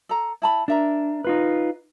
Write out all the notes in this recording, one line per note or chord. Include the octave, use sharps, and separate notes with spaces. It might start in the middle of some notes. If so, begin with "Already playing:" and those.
A4 A#5
E4 A5 B5
D4 A#4 E5 A#5
D#4 F4 B4